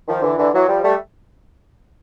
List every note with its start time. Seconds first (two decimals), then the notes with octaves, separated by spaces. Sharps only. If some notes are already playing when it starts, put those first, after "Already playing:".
0.08 D#3 F3
0.22 D3 E3
0.37 D3 E3
0.53 E3 F#3
0.68 F3 G3
0.83 G3 A3